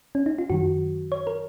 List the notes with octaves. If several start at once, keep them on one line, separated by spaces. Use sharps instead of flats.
C#4
D#4
F4
F#2 D#3 F#3 F#4
C#5
A#4